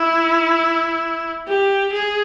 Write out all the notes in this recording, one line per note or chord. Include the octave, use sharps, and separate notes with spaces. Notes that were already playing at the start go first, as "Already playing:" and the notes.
Already playing: E4
G4
G#4